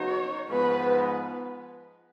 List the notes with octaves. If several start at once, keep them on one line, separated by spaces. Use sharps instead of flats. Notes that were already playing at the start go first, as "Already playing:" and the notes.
Already playing: C#3 F#3 B3 D#4 F#4 C#5
G#2 F3 B3 B4